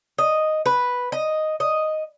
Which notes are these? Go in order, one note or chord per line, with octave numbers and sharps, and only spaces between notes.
D#5
B4
D#5
D#5